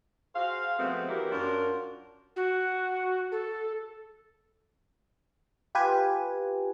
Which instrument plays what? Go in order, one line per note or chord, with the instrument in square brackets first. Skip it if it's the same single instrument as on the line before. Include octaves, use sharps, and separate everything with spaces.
[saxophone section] F#4 G#4 C5 F5
F3 G#3 A3 B3 C4 F#4
E3 F#3 A#3 E4 G4 A#4
F#2 D4 F4 F#4 A#4
[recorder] F#4
A4
[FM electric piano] F4 G4 B4 G#5